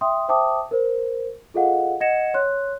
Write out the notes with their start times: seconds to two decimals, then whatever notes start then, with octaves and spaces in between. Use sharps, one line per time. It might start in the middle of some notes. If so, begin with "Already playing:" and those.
0.01 E5 G5 C6 D#6
0.28 C5 E5 G5 A5 D6 D#6
0.71 A#4 C5
1.54 F4 G#4 A4 D#5 F5 F#5
2.00 D#5 F#5 G#6 A#6 C#7 E7
2.34 C#5 C6 F#6